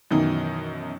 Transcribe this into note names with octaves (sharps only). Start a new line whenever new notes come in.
F#2 B2 D#3 E3 D#4